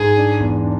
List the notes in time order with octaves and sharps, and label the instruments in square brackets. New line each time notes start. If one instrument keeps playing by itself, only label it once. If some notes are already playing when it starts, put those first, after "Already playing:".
Already playing: [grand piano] G#2 G#3 [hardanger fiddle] G#4
[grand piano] D4
E2
D4